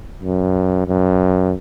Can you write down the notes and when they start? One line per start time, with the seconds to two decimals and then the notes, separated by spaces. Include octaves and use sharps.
0.23 F#2
0.87 F#2